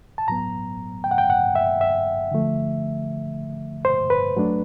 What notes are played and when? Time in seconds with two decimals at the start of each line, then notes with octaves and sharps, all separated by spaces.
0.18 A5
0.28 A2 F#3 B3 A#5
1.04 G5
1.11 F#5
1.18 G5
1.30 F#5
1.55 E5
1.81 E5
2.31 D3 F3 A3
3.85 C5
4.10 B4
4.37 F#3 A3 D4